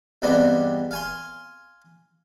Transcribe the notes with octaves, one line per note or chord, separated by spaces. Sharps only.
E2 G2 G3 G#3 B3 C4
F5 G#5 C6